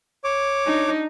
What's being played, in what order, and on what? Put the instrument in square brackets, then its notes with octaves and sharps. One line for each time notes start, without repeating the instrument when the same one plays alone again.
[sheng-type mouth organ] C#5 D6
[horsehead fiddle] D4 D#4